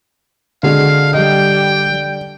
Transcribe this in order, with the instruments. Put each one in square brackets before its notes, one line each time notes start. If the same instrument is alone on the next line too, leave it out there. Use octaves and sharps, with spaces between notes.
[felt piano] D3 [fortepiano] G#3 F#4 G#4 [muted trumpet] F5
[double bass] G3 [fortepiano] D#5 [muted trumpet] G5